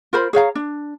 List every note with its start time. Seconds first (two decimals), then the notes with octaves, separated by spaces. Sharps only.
0.13 F4 A#4 C5 B5
0.33 G#4 C#5 F5 A#5
0.55 D4